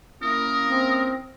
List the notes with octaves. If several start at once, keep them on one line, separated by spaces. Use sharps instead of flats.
A#3 C#4 E4 A#4 D#6
C4